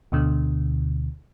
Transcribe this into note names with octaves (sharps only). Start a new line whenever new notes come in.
D2 B2 D3